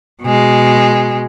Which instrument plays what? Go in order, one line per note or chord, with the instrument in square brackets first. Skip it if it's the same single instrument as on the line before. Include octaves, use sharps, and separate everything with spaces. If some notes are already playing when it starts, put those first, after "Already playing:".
[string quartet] B2 G#3